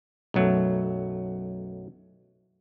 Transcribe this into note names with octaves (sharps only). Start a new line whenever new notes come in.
B1 F#2 F#3 A3